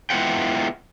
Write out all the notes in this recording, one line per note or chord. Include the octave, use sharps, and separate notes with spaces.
G#3 B3 E4 F4 F#5 G5